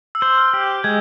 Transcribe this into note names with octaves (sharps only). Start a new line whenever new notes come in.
E6
C5
F6
G4
G6
G#3 G#6